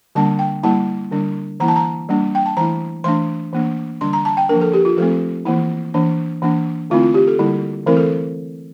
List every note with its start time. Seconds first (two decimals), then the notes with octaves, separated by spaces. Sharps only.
0.15 D3 G3 A#3 D4 A5
0.39 G5
0.63 G3 A#3 E4 A5
1.11 D3 G3 D4
1.60 E3 A#3 E4 A#5
1.68 A5
1.76 A#5
2.09 G3 A#3 D4
2.35 G5
2.46 A5
2.57 E3 A3 E4 A#5
3.04 E3 A3 D4 C6
3.53 E3 A#3 D4
4.01 D3 G3 D4 C6
4.13 A#5
4.25 A5
4.37 G5
4.49 F3 A#3 D4 A#4
4.61 A4
4.73 G4
4.85 F4
4.97 F3 A3 C4 A4
5.45 E3 A#3 E4
5.94 E3 A#3 D4
6.42 E3 A#3 D4
6.90 D3 A3 C4 E4 F4
7.02 F4
7.14 G4
7.27 A4
7.39 D3 G3 A#3 E4
7.86 E3 A3 C4 E4 A#4
7.97 A4